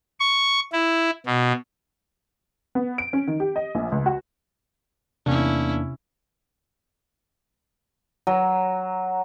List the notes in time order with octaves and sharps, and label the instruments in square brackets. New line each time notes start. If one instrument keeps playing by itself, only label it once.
[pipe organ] C#6
E4
B2
[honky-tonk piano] B3
D7
C#4
D#3
G4
D#5
A#1
C#2
F#4
[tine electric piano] E2 A#3 D4 [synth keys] C3 [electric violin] C#4 E4
[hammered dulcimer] F#3